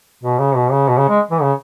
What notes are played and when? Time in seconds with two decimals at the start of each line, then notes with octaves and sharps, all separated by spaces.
0.24 B2
0.39 C#3
0.56 B2
0.71 C#3
0.88 B2
0.98 C#3
1.09 G#3
1.31 E3
1.42 C#3